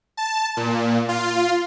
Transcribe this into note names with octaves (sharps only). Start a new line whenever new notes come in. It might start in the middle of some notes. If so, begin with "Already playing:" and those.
A5
A#2
F4